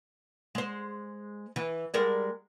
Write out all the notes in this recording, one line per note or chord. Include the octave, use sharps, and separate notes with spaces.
G#3 C5
E3
G3 G#3 A#4